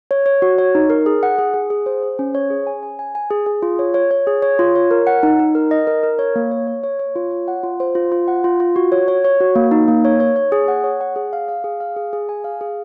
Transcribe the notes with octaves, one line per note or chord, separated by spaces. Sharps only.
C#5
C#5
F#4
C#5
D#4
A#4
G#4
F#5
G#4
G#4
G#4
C5
C5
C#4
C#5
G#4
G#5
G#5
G#5
G#5
G#4
G#4
F4
C#5
C#5
C#5
G#4
C#5
F4
C#5
A#4
F#5
D#4
D#4
A#4
D#5
A#4
A#4
C#5
A#3
C#5
C#5
C#5
C#5
F4
C#5
F#5
F4
C5
F4
F4
F#5
F4
F4
F#4
C#5
C#5
C#5
F#4
A#3
D#4
A#3
C#5
C#5
C#5
G#4
F#5
C#5
F#5
G#4
F5
F5
G#4
F5
G#4
G#4
G#5
F5
G#4